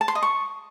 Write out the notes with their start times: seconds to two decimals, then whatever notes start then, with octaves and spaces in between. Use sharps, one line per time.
0.01 A5
0.08 C6
0.15 D#5
0.23 C#6